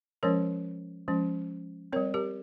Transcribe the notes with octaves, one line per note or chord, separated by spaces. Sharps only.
F3 G#3 C#4 A#4 C#5
F3 G#3 C#4
G3 C4 A#4 C#5
G4 A#4